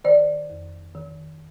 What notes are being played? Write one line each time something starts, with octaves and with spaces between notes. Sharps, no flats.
D#3 C5 D5
F2
D#3